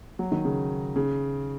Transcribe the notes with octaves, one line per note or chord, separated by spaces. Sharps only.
F#3
D#3
C#3
C#3